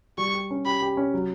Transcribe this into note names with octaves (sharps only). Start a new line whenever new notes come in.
G3 C#6
G4
C#4
G4 B5
G4
C#4
F#3